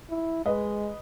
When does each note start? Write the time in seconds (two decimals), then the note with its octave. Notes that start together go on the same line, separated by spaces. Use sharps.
0.10 E4
0.46 G#3 B4 D#5